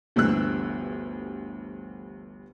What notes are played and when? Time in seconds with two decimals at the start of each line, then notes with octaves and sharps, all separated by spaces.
0.16 G1 D2 G2 E3 E6 F#6